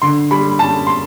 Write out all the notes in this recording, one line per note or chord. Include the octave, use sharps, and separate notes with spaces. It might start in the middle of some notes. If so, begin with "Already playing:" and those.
D3 C6
G3 B5
F#2 A5
C6